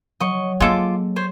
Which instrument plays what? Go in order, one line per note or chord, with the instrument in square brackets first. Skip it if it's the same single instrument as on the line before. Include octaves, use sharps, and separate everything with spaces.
[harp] F#3 [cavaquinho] D#5 C#6
[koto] G#3 A4 [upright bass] A#3 [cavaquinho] F4 D6
[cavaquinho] C5 C#5